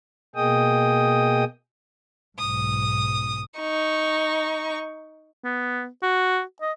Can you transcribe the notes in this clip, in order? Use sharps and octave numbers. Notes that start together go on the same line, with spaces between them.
B2 A#3 G#4 D#5 G5 D#6
B1 G#2 D#6
D#4 C#6
B3
F#4
D#5